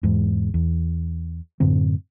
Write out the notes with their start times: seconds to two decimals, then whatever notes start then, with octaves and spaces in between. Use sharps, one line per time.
0.03 E2 G#2
0.54 E2
1.60 F#2 A2 D3 C4